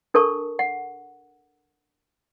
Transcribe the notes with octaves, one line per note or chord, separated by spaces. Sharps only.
D4 A4 A#4 A5 C#6
F#5